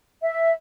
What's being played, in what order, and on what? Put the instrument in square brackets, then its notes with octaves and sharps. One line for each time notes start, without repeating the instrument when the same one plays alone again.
[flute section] E5